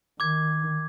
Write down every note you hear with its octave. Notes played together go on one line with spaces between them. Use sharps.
D#3 D6 G#6